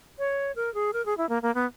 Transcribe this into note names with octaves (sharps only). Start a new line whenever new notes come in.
C#5
A#4
G#4
A#4
G#4
E4
A#3
A#3
B3